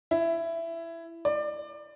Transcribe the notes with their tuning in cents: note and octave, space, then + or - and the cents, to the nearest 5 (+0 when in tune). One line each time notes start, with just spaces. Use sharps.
E4 +15
D5 +25